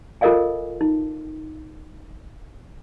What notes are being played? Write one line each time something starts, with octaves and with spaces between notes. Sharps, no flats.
F4 A4 A#4 D#5 F5 G#5
D#4